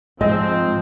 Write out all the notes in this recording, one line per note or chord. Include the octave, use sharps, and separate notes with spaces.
G#2 F3 C4 D#5